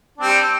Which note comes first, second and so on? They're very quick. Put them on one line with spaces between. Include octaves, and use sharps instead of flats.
D4 C4 G3